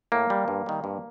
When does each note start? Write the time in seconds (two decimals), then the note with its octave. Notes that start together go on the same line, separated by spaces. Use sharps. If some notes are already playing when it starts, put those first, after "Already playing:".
0.12 A2 A#3
0.30 G3
0.48 G2
0.66 D#3 G3
0.84 G2